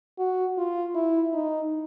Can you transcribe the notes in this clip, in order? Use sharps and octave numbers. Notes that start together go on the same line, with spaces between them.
F#4
F4
E4
D#4